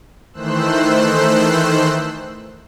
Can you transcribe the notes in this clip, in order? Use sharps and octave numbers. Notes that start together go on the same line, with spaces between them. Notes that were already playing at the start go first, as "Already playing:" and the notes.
D#3 E3 A3 C5 E6 F#6